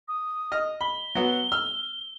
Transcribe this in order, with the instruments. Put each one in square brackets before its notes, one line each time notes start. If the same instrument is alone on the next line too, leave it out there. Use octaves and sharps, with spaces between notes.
[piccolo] D#6
[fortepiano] D#5 F6
[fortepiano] B5 [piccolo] G7
[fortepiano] F#3 B3
E6 F6